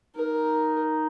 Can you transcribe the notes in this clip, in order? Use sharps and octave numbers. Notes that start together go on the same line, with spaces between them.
D#4 A#4